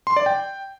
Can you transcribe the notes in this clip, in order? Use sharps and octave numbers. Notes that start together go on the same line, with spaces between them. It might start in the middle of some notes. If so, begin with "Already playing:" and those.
C6
D5
G5